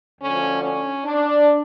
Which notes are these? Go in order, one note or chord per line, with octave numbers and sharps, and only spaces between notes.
D2 D3 F3 C#4
C#4
D4